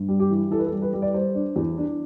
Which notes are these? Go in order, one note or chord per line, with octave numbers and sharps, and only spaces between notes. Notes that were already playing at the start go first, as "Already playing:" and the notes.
Already playing: G2
G3
G4
E3
E3 A4
B4
A4
G3
B4
G3
D5
G3 C5
D4
E2
D4